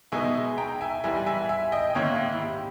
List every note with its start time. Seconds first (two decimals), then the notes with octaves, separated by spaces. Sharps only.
0.12 B2 G#3 D#4 E5 G#5
0.58 G5 A#5
0.81 E5 G#5
1.03 G#2 E3 G3 E5 G#5
1.26 E5 G#5
1.49 E5 G#5
1.72 D#5 G5
1.90 G5
1.95 G#2 D#3 A#3 C#4 C#5 E5
2.32 E4
2.41 G4